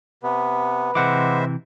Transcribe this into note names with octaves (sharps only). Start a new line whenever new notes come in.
C3 B3 B4
C3 E3 G#3 C5 E5 F#5 D6